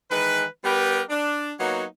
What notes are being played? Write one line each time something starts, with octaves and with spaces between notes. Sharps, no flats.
D#3 E3 G#3 B4
G3 B3 G4 A#4 B4
D4
F#3 A#3 B3 D#4 F#4 C#5